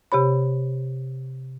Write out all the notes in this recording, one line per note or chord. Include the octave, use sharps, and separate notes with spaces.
C3 G4 C#5 B5